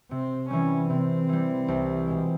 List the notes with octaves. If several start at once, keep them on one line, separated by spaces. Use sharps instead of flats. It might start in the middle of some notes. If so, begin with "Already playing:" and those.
C3 C4
E3 G3 C#4
C3 C4
E3 G3
C2
B2 G#3